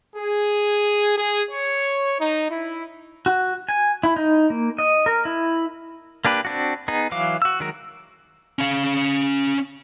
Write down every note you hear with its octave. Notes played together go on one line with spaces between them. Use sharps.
G#4
G#4
C#5
D#4
E4
F#4
G#5
E4
D#4
A#3
D#5
A#4
E4
A#3 D4 G4 B4
C4 D4 F#4
B3 D#4 G#4
E3 F#3 F5 D6
F#4 E6
D#3 F#3 G#3 F#4 A#4
C#4 F5